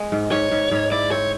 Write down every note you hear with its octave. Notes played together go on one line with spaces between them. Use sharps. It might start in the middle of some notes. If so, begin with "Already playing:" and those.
Already playing: G#3
G#2
G#2 C#5
G#2
G#2
E4 D5
C4 C#5